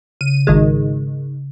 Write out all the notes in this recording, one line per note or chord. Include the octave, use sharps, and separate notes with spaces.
C#3 D#7
G#1 D#3 G#3